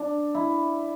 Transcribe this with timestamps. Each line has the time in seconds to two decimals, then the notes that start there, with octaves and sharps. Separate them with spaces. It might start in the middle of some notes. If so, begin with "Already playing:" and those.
Already playing: D4
0.35 E4